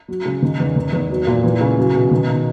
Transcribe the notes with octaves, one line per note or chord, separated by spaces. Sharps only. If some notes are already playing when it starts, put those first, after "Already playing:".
F#3
C#3
D#3
E2
D#3
E2
F#3
A#2
E3
C#3
F#3
B2
D#3